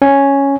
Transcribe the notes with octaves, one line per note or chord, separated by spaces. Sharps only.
C#4